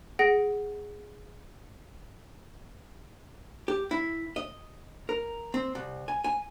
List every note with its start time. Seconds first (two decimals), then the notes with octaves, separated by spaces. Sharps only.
0.19 G#4 F#5 A#6 D7
3.68 G4
3.91 E4
4.36 D#5
5.09 A#4
5.54 C4
5.75 C2
6.08 G#5
6.24 G#5